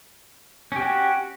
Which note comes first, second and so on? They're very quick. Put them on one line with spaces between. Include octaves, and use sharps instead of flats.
C#4 G4 F#4